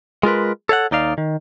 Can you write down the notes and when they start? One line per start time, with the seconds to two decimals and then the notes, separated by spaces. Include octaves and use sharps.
0.23 G#3 F4 A#4 B4
0.69 A4 C#5 F5 F#5
0.91 D#2 D#4 D5 F5
1.18 D#3